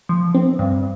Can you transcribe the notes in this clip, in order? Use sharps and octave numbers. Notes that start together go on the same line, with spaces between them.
F3
C4
G2